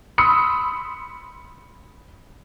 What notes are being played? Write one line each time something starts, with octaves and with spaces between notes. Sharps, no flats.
B5 C6 D#6 E6 C#7